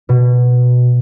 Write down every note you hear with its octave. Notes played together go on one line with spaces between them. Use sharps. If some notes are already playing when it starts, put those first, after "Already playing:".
B2